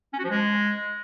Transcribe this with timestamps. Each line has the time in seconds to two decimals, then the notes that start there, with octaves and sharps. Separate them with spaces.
0.13 C#4
0.19 F#4
0.24 F3
0.30 G#3